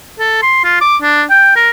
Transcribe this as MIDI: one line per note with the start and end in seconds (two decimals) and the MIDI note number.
0.19 0.39 69
0.43 0.62 84
0.64 0.78 65
0.81 0.97 86
1.02 1.24 62
1.30 1.53 79
1.56 1.70 70